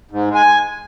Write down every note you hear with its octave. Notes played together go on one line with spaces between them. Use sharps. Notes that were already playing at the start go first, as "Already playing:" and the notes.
G#2
G#3
G#5